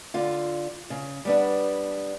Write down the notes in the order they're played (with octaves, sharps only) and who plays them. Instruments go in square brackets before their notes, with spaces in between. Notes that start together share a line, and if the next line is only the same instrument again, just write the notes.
[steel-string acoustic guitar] D3 F4
C#3
G3 B3 D4